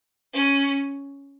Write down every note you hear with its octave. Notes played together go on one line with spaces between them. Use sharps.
C#4